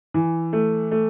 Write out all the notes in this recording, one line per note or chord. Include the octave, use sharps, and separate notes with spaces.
E3
A3
A3